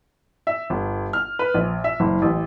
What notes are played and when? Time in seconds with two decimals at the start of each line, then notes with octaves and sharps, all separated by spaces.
0.47 E5
0.70 G1
1.13 F6
1.39 B4
1.55 A#1
1.84 E5
2.00 F#1
2.22 A1